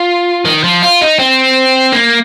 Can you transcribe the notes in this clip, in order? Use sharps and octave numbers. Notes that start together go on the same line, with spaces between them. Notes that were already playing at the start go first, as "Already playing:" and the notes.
Already playing: F4
D#3
F3
F4
D#4
C4
A#3